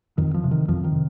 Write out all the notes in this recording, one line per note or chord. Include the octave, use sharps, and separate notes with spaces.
F2 D#3
F3
C3
D#3
F2 F3
D#3
C3